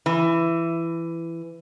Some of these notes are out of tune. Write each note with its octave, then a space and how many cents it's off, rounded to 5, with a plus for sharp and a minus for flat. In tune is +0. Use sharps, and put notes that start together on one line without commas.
E3 +15